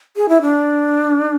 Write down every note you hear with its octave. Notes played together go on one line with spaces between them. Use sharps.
G#4
E4
D4